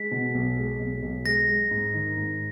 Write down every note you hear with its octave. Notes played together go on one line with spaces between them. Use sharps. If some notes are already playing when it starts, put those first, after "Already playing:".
Already playing: G#3 B6
B2
B1
G#3
B1
B1
G#3 A#6
G#3
G#2
D#3
G#2